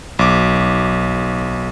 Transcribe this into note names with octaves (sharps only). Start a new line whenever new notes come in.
B1 D6